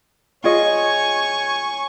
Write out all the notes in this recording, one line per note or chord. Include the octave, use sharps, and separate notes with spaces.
F4 G#4 C#5 D#5 G#5 C#6